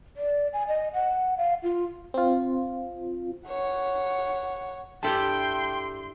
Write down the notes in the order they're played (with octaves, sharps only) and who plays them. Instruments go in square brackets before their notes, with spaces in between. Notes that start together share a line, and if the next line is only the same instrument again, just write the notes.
[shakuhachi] D5
G#5
D#5
F#5
F5
F4
[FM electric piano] C4 F4
[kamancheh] C#5 F#5
[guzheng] G2 E4 B5 [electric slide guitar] G4 A4 A5 [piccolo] G5 [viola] C6